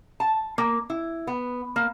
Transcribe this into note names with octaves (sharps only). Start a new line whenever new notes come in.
A5
A#3
E4
B3
A#3